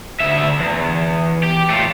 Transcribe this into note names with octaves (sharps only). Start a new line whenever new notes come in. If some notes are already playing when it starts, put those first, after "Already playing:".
D2 E5
E2
G4
A3 F4